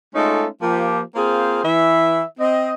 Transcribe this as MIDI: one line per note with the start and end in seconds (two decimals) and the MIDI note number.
0.15 0.47 56
0.15 0.47 57
0.15 0.47 61
0.15 0.47 63
0.15 0.47 65
0.15 0.47 69
0.62 1.01 53
0.62 1.01 58
0.62 1.01 67
1.16 1.63 58
1.16 1.63 60
1.16 1.63 65
1.16 1.63 68
1.16 1.63 72
1.64 2.24 52
1.64 2.24 76
2.40 2.74 60
2.40 2.74 75